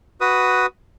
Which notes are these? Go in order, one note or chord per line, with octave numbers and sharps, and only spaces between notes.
F#4 B4 D#6